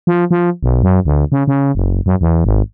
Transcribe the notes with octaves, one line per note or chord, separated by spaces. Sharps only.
F3
F3
B1
F#2
D2
C#3
C#3
F#1
F#2
E2
G#1